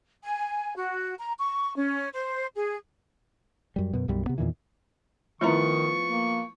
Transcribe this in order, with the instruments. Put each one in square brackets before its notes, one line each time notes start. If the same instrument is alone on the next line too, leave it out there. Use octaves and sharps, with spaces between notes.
[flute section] G#5
F#4
A#5
C#6
C#4
C5
G#4
[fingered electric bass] F#2 G3
F#2 B2
B1 F#2 G3
C3 B3
E2 A#2 D#3 E3
[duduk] D#3 [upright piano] F3 B3 [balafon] A3 E4 A#5 [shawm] C#6
[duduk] A#3